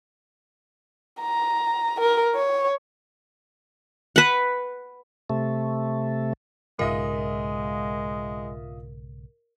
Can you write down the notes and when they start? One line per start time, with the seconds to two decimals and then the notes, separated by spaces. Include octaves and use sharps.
1.21 A#5
2.01 A#4
2.35 C#5
4.16 B4 F#5
5.30 C3 A3
6.79 B1 G#2 C#3 G#3 F4 A#4 D#5 E5